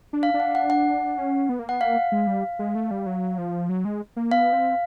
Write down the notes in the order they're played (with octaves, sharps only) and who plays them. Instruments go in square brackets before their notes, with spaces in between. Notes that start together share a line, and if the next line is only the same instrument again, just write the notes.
[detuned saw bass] D4
[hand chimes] F5
[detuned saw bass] D4
[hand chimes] F#5
F#5
F#5
[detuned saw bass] C#4
B3
A#3
[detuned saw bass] B3 [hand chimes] F#5
[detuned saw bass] A#3 [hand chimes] F5
[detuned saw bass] G#3
G3
G#3
A3
G3
F#3
F3
F#3
G#3
A#3
[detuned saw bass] B3 [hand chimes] F5
[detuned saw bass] C4